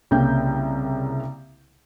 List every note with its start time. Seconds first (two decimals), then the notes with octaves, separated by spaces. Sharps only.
0.11 C2 C#3 A#3 G5 G6